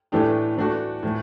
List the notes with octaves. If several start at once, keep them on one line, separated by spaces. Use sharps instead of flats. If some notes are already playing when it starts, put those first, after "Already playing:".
A2 E3 A3 D4 G4
E3 A3 D4 F#4
A2 E3 A3